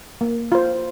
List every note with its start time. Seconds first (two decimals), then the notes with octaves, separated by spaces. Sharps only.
0.21 A#3
0.52 F4 C5